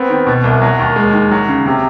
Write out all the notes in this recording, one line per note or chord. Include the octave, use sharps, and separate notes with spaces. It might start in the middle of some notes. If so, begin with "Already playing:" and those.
Already playing: B3 C4
D#3
B2
C2
F#3
D#2
G#3
D#3
F#3
C#3
C3